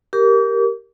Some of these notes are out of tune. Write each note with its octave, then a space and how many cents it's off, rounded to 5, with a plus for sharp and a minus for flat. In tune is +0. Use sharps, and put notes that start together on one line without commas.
G4 +0 A#4 +0 D6 -40